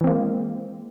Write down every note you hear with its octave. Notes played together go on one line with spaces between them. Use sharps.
E3 G#3 A#3 C4